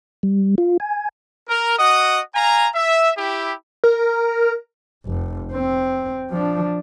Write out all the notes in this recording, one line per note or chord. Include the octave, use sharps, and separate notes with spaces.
G3
F4
G#5
A#4
F#4 D#5 F#5 D#6
F5 G#5 A#5
E5
E4 G4
A#4
F1
C4
F3 D4